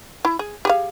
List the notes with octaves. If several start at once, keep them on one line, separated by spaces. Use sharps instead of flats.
E4
G#4
G4 G#4 F5